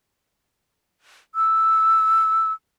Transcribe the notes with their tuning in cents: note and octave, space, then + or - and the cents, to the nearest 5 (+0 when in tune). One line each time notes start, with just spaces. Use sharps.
E6 +0